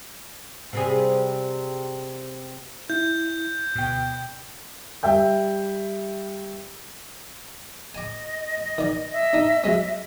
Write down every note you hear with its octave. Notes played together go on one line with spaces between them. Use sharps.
C3 G3 G#4
E4 G6
D2 B2 G5
G3 E5 G5 G6
D#5 G#5 D6
D#3 D5
D#5 E5
D4 D#4
F#3 G#3 C#4